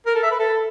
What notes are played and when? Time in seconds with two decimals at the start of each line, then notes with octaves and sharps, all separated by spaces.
0.06 A#4
0.15 A4
0.23 E5
0.31 B4
0.40 A4